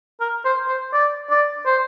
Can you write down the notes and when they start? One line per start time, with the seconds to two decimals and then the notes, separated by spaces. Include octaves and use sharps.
0.20 A#4
0.45 C5
0.68 C5
0.93 D5
1.30 D5
1.66 C5